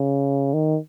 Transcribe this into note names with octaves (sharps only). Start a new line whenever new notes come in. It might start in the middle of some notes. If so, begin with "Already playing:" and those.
Already playing: C#3
D#3